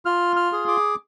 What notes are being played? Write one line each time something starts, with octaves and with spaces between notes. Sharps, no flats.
F4 F6
F6
G#4
D6